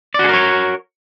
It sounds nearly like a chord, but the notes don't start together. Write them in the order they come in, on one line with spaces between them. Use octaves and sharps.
D5 F#4 G#4 A#4 C#5